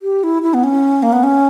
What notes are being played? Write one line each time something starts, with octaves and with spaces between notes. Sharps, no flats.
G4
E4
E4
B3
C#4
A#3
B3
C#4